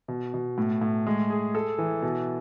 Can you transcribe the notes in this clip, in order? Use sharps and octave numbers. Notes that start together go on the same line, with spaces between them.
B2
B2
A2
A2
G#3
G#4
A4
E3
B2